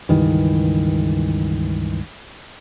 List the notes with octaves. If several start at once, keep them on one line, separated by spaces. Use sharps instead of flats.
C#2 G2 D#3 E3